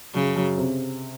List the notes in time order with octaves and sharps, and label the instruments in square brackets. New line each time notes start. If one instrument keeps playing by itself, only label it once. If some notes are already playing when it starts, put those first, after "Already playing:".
[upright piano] F#2 [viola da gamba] C#3
[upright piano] F#2
C3